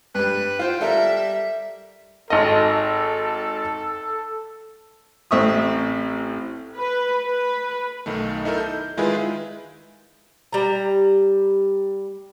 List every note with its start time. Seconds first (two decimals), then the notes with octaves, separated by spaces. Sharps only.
0.15 G2 G3 B4
0.59 F4 C5 G5
0.81 G3 A4 A#4 E5
2.30 G#1 A4 D#5
5.31 A1 C4 E5 C#6 D#6
6.77 B4
7.26 B4
8.06 B1 D#3 A3
8.45 D#4 E4 A4 A#4
8.58 G6
8.97 D#3 G#3 E4 F4 G#4 B4
10.53 G3 A#5